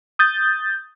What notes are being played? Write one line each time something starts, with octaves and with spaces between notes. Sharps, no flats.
D#6 G6 A6